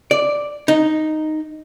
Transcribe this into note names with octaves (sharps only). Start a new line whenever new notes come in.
D5
D#4